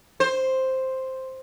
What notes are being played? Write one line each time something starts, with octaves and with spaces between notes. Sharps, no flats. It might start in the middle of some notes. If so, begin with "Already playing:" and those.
C5